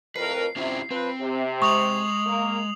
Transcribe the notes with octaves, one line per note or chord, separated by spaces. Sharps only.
F2 A2 A#4 B4 C7
C3 C#4 E4 F4
F3 C4 B4
C3
G#3 C#6 D#6 F7 F#7
A#3